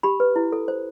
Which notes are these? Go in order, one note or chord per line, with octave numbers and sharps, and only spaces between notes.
G4 B5
B4
E4
A4
C5